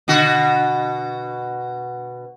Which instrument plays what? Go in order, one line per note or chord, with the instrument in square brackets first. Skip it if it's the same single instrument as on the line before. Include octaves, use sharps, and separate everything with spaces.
[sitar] B2 D3 F#4